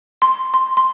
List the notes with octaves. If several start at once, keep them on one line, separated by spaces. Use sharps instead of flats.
C6
C6
C6